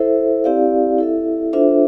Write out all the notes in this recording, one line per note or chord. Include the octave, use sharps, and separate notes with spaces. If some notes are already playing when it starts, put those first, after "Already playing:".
Already playing: E4 A4 C5 E5
C4 E4 G4 D5 F5
E4 A4 E5
D4 F4 A4 C5 E5